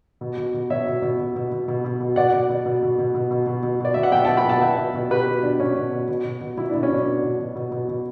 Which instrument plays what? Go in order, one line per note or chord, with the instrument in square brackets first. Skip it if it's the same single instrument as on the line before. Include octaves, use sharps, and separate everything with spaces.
[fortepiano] B2
B2
B2
B2 C#5 E5
B2
B2
B2
B2
B2
B2
B2
B2
B2 D5 F#5
B2
B2
B2
B2
B2
B2
B2
B2
B2
B2 D5
B2 E5
F#5
B2 E5 G5
B2 F#5 A5
G5 B5
B2 F#5 A5
B2 E5 G5
B2
B2
B2 G4 B4
B2
B2 D4
B2 C#4
B2
B2
B2
B2
B2
B2 E4
B2 D4
C#4
B2 D4
B2
B2
B2
B2
B2
B2